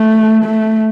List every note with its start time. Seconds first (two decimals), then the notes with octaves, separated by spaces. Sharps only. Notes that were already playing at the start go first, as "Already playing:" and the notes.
Already playing: A3
0.45 A3